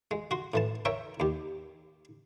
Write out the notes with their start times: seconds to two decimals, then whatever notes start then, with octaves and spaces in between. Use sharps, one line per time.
0.11 G#3
0.31 F#4 C6
0.54 A2 E3 A5
0.85 A#4 C#5 E5 G5
1.20 D#2 G4